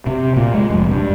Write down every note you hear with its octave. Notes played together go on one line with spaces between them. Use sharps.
C3
A#2
G#3
F1
G2